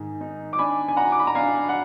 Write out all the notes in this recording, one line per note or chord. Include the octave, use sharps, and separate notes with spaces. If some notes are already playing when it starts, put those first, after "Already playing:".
Already playing: G#2 D#3 D#4 G#5
D#4
D6
D4 G#5 B5
G#5
D4 F#5 A#5
D6
B5
A#5
D4 F5 G#5
F#5